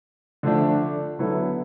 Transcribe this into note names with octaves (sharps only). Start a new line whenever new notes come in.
D3 F3 A3 D4
D3 F#3 B3 E4 A4